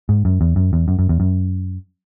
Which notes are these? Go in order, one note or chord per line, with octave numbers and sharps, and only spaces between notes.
G#2
F#2
E2
F#2
E2
F#2
F#2
E2
F#2